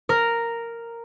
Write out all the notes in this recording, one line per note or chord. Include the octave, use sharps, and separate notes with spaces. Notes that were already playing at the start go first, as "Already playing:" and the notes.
A#4